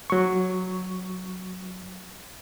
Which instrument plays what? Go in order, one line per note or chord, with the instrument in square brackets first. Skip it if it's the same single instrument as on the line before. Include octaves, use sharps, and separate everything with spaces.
[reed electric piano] F#3 C#6